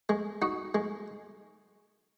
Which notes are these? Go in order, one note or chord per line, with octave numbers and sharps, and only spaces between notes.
G#3
D#4 F#4
G#3